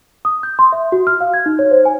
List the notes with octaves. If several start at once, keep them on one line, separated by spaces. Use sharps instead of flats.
D#6
G6
C6
E5
F#4
F6
F5
G#6
D#4
C#5
C5
G#5